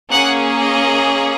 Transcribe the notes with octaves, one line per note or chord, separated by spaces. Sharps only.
A#3 C#4 G#4 F#5
D#5